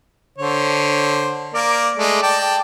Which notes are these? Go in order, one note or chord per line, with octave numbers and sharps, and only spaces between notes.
D3 C5 C#5
A#3 A#4 D5
G#3 A3 D5
D5 G5 A5